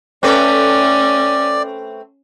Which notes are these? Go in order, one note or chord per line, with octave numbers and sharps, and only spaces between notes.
A3 C4 C#4 B4 D5